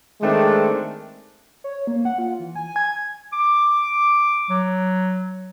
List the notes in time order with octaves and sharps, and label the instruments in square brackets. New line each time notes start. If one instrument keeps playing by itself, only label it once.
[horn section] D#3 G#3 A3 C4 D4
[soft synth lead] C#5
A#3
F#5
F4
E3
G#5
G#6
[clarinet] D6
F#3